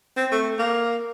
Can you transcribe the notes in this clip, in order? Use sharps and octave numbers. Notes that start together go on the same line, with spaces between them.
C4
A3
A#3